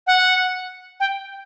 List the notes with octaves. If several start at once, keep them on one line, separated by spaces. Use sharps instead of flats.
F#5
G5